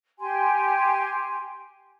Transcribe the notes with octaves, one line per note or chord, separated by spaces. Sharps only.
G4 G#5 C6